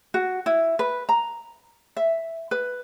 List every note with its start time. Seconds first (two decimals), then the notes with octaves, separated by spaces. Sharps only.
0.14 F#4
0.46 E4
0.79 B4
1.09 A#5
1.97 E5
2.51 B4